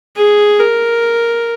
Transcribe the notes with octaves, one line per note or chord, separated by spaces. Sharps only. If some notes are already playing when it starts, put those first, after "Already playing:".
G#4
A#4